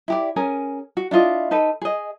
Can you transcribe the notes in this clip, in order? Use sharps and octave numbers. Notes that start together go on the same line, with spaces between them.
E4 G4 D5
C#4 G#4 A#4 G#5
F#4
D4 E4 F4 D#5
D#4 A4 B4
G#4 D#5